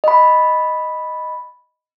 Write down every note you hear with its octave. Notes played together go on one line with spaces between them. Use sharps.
D#5 B5